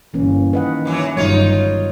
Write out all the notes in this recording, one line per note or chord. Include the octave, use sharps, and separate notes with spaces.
G1 E3 A#3 C#4
D#3 B4 D#5 F#5
G2 E3 F#3
G1 G2 D#3 F#3 D#4 F4 C#5